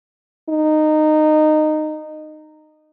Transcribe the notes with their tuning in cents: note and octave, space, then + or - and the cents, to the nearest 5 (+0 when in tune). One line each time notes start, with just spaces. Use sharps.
D#4 -15